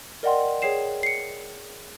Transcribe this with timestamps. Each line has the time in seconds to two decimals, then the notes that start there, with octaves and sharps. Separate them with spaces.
0.23 A#4 D5 D#5 F#5 G5 C6
0.62 G#4 C#5 G5 C7 E7
1.03 C7 C#7